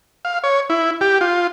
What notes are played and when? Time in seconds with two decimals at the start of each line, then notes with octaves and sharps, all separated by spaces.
0.25 F5
0.44 C#5
0.70 E4
1.01 G4
1.21 F4